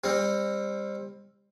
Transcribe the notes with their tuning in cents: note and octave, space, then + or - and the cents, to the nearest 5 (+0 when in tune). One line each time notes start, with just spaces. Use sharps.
G3 +30 C4 +20